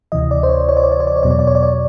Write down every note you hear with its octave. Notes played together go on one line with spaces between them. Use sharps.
D2 C3 E3 D#5
D5
C5
C#5
C#5
D5
C#5
D5
C#5
D5
C#5
E2 B2 F#3 D5
C#5
D5
C#5
D5
C#5